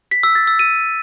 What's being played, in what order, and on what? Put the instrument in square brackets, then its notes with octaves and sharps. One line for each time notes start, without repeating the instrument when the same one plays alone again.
[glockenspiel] B6
E6
A6
E6
D#7